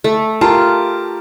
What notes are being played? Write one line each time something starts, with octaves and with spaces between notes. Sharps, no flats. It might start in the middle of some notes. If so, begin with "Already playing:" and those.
A3
F4 G4 A#4 A5